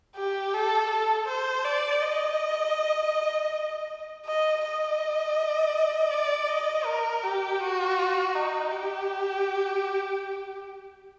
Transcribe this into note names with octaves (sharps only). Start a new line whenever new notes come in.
G4
A4
A4
C5
D5
D#5
D#5
D#5
D5
D#5
A#4
G4
F#4
D#4
G4